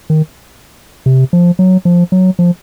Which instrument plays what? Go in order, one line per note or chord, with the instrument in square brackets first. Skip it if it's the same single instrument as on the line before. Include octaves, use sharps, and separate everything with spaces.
[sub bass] D#3
C3
F3
F#3
F3
F#3
F3